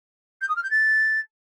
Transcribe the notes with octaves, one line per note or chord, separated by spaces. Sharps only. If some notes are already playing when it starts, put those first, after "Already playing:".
G6
D#6
F6
G6
A6